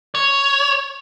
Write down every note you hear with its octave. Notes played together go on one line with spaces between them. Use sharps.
C#5